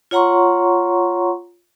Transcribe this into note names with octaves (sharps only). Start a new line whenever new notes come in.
F4 C#5 F#5 A#5 C6 C#6